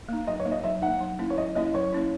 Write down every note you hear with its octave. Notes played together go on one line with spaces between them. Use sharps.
A#3 D#4
F#3 D#5
C#5
A#3 D#4
D#5
F#3 E5
A#3 D#4 F#5
F#3
A#3 C#4 E4
C#5
F#3 D#5
A#3 C#4 E4 D#5
F#3 C#5
A#3 C#4 E4